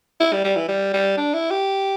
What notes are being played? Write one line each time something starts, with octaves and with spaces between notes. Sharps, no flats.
E4
G3
G3
E3
G3
G3
D4
E4
G4